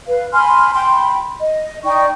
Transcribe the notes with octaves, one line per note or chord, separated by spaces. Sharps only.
B4 F5
G#5 B5 C6 F6
G5 B5 C6
D#5
D#4 D5 G5 C#6